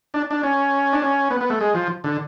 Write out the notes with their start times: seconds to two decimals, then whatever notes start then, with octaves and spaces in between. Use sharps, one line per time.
0.14 D4
0.31 D4
0.43 C#4
0.93 D4
1.02 C#4
1.30 B3
1.41 B3
1.50 A3
1.61 G#3
1.75 F3
2.04 D3